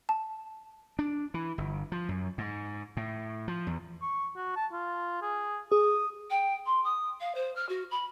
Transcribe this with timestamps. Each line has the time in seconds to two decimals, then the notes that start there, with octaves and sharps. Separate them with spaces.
0.09 A5
0.99 D4
1.34 E3
1.58 G1
1.92 F3
2.09 F#2
2.38 G#2
2.97 A2
3.48 F3
3.67 E2
4.02 C#6
4.36 F#4
4.56 A5
4.73 F4
5.22 G#4
5.72 G#4 D#6
6.30 G5
6.66 C6
6.84 D#6
7.20 F5
7.34 C5
7.55 F6
7.68 F#4
7.90 B5